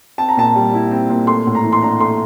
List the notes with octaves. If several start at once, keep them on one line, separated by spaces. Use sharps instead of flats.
C4 A5
A#5
A#2 A5
G3
E4
C4
A#2
A3 C6
A2
A#5
E3
C6
D4 A#5
A3 C6